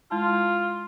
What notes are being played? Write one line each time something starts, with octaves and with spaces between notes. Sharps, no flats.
G#3 E4 F4 A5